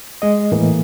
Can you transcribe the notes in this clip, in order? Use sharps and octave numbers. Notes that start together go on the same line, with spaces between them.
G#3 D#5
A2 E3 A#3